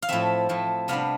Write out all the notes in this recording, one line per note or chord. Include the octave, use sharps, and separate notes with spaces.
F5
A2 F3 A3 C4 E5
A2 F3 A3 C4
C3 G3 B3 D4 F5